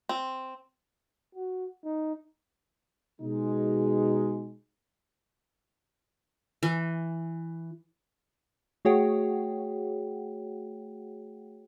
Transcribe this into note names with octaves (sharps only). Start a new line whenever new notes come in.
C4
F#4
D#4
B2 G#3 D#4
E3
A3 F#4 G#4 C#5 F#5 G5